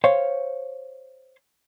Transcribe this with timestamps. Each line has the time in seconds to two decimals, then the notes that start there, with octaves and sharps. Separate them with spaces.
0.04 C5 C#5 F5